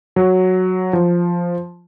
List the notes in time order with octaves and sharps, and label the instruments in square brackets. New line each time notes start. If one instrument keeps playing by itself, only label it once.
[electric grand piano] F#3
F3